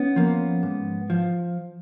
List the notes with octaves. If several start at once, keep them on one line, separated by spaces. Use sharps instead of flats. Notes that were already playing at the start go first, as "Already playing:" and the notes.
Already playing: B3 C#4
F3 A#3
G#2
F3